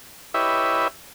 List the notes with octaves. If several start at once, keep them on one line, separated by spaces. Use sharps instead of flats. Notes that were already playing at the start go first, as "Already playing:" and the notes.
E4 G4 B4 C#5 D#5 E5